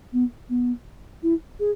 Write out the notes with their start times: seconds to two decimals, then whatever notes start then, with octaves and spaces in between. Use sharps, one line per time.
0.13 B3
0.49 B3
1.23 E4
1.60 G#4